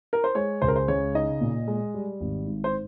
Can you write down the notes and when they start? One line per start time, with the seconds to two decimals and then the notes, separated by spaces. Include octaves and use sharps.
0.13 A#4
0.24 C5
0.35 G#3 C#5
0.62 C#2 C5
0.68 A#4
0.76 C5
0.88 C#3 C#5
1.15 D#4 D#5
1.41 A#2
1.67 G#3
1.94 G3
2.21 G#1
2.47 G#2
2.64 C5